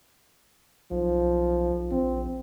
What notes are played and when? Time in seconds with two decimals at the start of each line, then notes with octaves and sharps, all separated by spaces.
0.91 B1 F3
1.91 A#1 C4